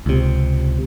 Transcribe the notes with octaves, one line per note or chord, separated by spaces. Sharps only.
C#2 C3